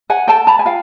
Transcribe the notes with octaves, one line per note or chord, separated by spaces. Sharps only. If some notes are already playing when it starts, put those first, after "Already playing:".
F#5 G#5
A4 G5 A5
A5 B5
G#5
F4 F5 G5